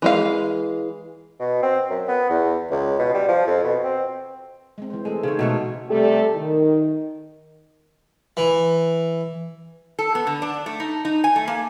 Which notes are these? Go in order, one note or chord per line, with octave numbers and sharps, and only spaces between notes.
E3 G#3 F5
B2
C4
F#2
B3
E2
C#2
B2
G3
F3
F2
B2
C4
G#3 C4
E3 C5
G#3 A3 G#4 A4
C#3 D#4 C5 C#5
B2 G#3 A3 C#5
C3 G3 A3 G4 A4
D#3
E3
A4
B3
D3
D4
A3
D#4
D#4
G#5
A3
A#3